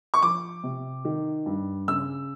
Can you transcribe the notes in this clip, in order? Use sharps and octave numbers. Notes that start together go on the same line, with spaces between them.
C#6
F3 D6
C3
D#3
G2
C#3 E6